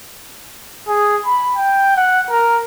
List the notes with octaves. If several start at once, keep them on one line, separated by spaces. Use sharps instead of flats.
G#4
B5
G5
F#5
A#4